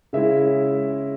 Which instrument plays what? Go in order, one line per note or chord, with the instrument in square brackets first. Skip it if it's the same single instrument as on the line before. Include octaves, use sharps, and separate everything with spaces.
[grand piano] C#3 G#3 C#4 E4 E5